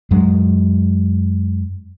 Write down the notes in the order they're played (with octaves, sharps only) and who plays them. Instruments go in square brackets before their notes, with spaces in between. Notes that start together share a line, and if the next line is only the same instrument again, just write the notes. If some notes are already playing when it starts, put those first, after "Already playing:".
[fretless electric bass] F#2 F#3 G#3